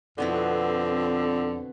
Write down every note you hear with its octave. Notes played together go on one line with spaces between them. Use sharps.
F2 B2 D3 B3 C4 E4